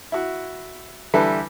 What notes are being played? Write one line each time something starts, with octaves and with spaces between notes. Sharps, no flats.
E4 F#4
D3 E3 G3 E4 A4 B4